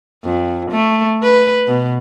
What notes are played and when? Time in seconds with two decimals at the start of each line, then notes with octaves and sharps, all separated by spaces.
0.24 F2
0.71 A3
1.23 B4
1.68 B2